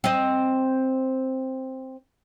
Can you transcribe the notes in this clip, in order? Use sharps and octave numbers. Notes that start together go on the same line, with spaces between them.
C4 D#5